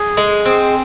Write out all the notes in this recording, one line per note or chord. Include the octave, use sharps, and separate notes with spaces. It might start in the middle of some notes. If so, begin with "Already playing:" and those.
Already playing: G#4
G#3
C4